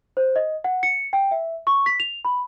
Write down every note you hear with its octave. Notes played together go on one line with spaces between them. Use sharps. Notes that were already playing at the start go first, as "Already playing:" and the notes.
C5
D#5
F#5
C#7
G5
E5
C#6
B6
F7
B5